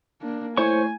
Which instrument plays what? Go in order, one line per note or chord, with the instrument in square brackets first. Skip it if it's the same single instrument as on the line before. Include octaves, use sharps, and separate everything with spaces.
[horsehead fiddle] A#3 D4
[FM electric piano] A3 E4 [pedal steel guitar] C5 C#5 C#6 [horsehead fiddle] G#5